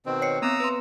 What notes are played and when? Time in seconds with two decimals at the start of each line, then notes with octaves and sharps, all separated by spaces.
0.06 B2 D#3 C4
0.22 C#5 C7 C#7
0.42 B3 C4 A#5 D#6 E6
0.60 B4 C6